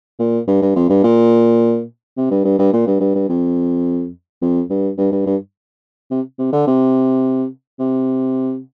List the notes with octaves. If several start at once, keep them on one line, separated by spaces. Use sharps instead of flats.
A#2
G2
G2
F2
G2
A#2
C3
G2
G2
G2
A#2
G2
G2
G2
F2
F2
G2
G2
G2
G2
C3
C3
D3
C3
C3